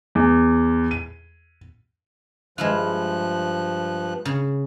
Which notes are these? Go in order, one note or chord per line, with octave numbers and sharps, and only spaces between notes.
E2
D#7
G2 F3 G#3 E4 F4 F#6
C#3